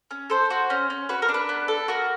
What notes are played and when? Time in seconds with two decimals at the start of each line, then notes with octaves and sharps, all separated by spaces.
0.11 C#4
0.30 A4 C5
0.50 F#4
0.70 C#4
0.90 C#4
1.09 F#4 B4
1.22 A#4
1.29 D4
1.34 B4
1.49 B3
1.68 A4
1.88 F#4 A#4